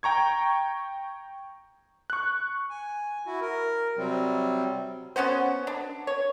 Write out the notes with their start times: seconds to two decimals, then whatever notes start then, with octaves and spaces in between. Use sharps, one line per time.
0.03 G5 A#5 C#6 G#6
2.10 C#6 F#6
2.70 G#5
3.26 E4 F#4
3.41 A#4
3.97 C3 F#3 G3 C4
5.16 B3 C#4 F#4 C5
5.67 D4
6.07 C#5